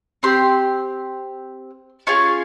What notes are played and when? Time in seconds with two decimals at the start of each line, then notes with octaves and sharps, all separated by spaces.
0.23 C4 G4 C6
2.07 C#4 F4 G#4 C#6